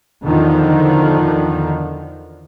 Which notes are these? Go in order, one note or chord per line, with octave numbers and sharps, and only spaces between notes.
E2 D3 D#3 F3